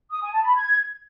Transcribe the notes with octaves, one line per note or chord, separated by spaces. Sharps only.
D#6
G#5
A5
B5
G#6